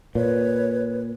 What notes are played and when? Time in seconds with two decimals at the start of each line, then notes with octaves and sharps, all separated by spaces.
0.15 A#2 B4 C#5